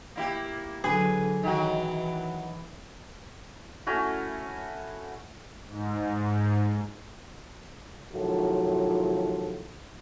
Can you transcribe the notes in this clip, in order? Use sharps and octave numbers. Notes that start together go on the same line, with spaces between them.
A#3 E4 G4
D3 F#3 G#4 B4
D#3 E3 F#3 F#4
A3 C#4 E4 F#4
G#2
A2 C3 D#3 F3 F#3 F4